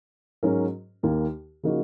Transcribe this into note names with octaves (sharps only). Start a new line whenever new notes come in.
G#2 F#3 C#4 F#4 A#4
D#2 D#3 A#3
C#3 F3 A#3 D#4 F#4